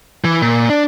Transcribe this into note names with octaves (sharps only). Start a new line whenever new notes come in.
E3
A#2
D4